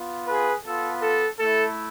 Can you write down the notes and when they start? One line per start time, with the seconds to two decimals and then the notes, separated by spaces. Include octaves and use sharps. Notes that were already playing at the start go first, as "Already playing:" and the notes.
Already playing: B3 F4
0.28 G#4 B4
0.65 B3 F4 A4
1.02 A4
1.39 A3 E4 A4